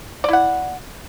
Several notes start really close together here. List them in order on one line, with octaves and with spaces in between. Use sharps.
D5 E4 F#5